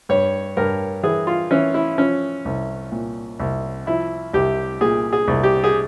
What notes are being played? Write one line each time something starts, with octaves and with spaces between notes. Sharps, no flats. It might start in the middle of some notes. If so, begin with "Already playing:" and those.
G2 C#5
G2 A#4
E3 G#4
F4
E3 C#4
E4
F3 C#4
C2
A#2
C2
F3 E4
C2 G4
A#2 G#4
G#4
C2
G4
G#4